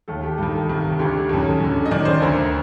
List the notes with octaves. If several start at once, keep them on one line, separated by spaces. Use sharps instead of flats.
D#2 D#3 A4
G4
G2 D#3 A4
C2 C3 D#3
D2 D3 G4
F#2 D#3 A4
F#2 D3
D#5
F#2 D#3 D5
C5
D2 D3 A#4